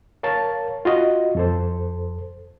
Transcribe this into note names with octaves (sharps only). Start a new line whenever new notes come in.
A#4 C#5 F5 A5
F4 F#4 D#5
F2 A4 C5